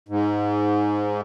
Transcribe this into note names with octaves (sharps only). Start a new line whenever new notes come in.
G#2